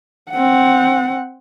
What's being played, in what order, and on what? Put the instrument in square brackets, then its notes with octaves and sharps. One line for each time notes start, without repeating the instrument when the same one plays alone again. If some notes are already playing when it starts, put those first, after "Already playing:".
[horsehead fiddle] C4 F#5